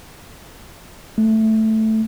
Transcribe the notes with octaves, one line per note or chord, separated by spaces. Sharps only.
A3